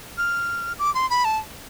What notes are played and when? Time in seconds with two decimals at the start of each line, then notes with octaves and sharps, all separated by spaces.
0.18 F6
0.79 D6
0.95 C6
1.10 B5
1.25 A5